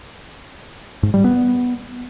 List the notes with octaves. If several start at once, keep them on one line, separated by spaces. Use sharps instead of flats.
G#2
G3
B3